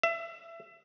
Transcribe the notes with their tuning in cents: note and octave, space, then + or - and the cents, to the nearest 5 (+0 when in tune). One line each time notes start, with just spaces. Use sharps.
E5 +25